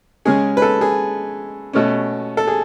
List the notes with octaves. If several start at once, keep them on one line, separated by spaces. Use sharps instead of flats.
C#3 G#3 C#4 G#4
B4
A4
G#4
B2 A3 C#4
A4
G#4